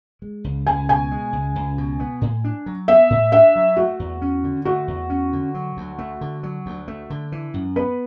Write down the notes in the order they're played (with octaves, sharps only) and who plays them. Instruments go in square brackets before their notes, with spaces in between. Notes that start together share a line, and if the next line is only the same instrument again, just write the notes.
[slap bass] G#3
C#2
[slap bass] C#2 [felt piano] G#5
[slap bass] B2 [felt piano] G#5
[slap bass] G#3
C#2
C#2
B2
B3
A2
D4
F#3
[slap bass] B3 [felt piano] E5
[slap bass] A2
[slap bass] D4 [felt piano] E5
[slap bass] F#3
[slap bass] A3 [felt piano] F#4
[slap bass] E2
C#4
D3
[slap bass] A3 [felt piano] F#4
[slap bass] E2
C#4
D3
F#3
D2
A3
D3
F#3
D2
A3
D3
E3
F#2
[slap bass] B3 [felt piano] B4